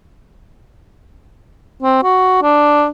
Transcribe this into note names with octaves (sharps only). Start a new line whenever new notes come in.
C4
F#4
D4